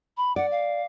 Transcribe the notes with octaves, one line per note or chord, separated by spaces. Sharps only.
B5
D5 F#5
F5